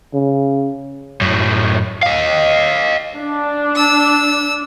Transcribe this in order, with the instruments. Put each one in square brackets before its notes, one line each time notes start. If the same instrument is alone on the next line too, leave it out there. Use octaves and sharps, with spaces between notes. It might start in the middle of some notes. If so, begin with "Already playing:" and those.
[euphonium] C#3
[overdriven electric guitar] F#2 A2
D#5 F5
[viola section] D4
[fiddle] E6